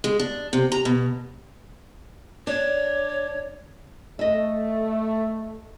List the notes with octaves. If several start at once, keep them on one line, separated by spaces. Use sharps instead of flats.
G#3
D4
C3
A#5
B2
D4 C#5
A3 D#5 E5